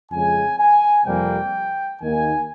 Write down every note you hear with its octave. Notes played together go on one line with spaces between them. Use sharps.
F2 C#3 G#3 G#5
G#5
F2 C3 G3 A#3 G5
D#2 D#3 A#3 G#5